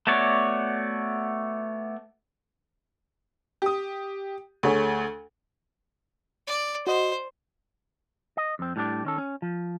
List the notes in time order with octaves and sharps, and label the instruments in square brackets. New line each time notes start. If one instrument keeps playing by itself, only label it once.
[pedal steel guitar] A3 B3 F#4 C#5 D5
[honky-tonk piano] G4 D#6
D2 A3 G#4 C#5
[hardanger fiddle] D5
[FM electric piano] F#4 D#5 [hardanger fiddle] C5
[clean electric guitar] D#5
F2 C4
A2 G3 D4 D5
D#3 C#4 A4
C#4
F3